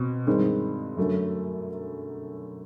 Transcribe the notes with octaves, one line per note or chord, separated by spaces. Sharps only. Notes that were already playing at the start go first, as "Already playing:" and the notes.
Already playing: B2 C4
G2 D#3 G#3 C4
F#2 D3 F#3 A3